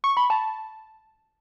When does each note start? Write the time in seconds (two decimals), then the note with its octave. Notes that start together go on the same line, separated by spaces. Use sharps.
0.04 C#6
0.17 B5
0.30 A5